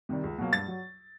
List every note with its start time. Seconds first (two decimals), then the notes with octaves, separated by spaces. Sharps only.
0.09 C3 D#3 G3
0.23 C#2
0.38 B2 F#3 A#3
0.53 G2 A6
0.68 F#3